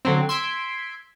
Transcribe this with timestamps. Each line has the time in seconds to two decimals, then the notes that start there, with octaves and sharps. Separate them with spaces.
0.05 D3 F#3 C4
0.29 C6 E6 G#6 B6 D7